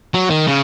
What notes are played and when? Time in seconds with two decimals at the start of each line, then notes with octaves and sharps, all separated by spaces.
0.14 F#3
0.30 D#3
0.47 C#3